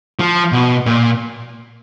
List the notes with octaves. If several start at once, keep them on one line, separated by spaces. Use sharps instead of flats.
F3
B2
A#2